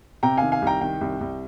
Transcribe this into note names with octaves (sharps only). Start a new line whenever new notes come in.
C3 G5 A#5
D#3 F5 G#5
F5 G#5
C2 G5 A#5
D#3 G5
C2
C2